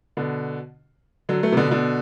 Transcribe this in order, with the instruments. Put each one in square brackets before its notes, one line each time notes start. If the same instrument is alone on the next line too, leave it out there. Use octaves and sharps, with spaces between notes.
[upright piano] B2 D3
D3 F#3
F#3 A3
C3
B2 D3
B2 D3